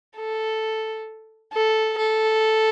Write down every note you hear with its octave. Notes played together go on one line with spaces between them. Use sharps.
A4
A4
A4